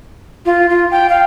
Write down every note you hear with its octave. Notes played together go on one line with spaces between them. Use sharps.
F4
F4
G5
F5